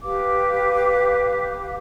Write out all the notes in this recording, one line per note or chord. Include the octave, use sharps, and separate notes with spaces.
G4 B4 F5 D6